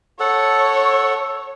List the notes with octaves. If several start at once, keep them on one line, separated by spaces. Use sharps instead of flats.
A4 C#5 F#5